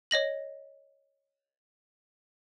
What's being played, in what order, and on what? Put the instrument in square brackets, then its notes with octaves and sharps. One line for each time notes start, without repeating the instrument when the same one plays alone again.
[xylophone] C#5 D#5 A#6 F#7